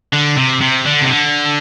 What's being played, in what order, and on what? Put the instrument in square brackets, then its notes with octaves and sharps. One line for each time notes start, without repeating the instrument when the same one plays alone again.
[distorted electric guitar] D3
C3
C3
D3
C3
D3